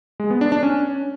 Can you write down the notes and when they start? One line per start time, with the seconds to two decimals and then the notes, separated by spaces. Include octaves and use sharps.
0.20 G#3
0.30 B3
0.41 D4
0.52 D4
0.63 C#4